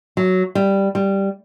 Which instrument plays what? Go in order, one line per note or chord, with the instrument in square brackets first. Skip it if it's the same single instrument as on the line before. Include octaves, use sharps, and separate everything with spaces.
[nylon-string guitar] F#3
G3
G3